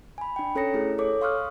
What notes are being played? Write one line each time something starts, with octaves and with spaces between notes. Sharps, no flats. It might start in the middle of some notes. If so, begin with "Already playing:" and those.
G#5 B5
D4 G5
C#4 A4 C#5 A#5 A#6 C#7
A3 E4 G#4
A4 C#5 D6
F5 C6 C#6 D#6 F6 F#6